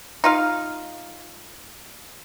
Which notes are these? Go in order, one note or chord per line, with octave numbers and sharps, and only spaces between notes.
D#4 F4 F5